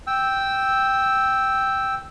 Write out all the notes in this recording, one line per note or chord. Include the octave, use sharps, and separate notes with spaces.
G5 E6